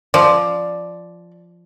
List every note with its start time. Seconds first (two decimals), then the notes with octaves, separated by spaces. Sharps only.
0.14 F3 D5